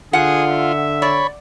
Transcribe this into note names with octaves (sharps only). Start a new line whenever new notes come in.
D3 F4 G#4 F#5
E5
C#5 D5 B5